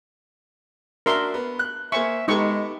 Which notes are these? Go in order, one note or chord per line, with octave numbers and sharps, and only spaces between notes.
D4 F#4 A#4 E5 C6
B3
F#6
A#3 C5 E5 G#5 C#6
G#3 B3 D#4 G4 A4 C#6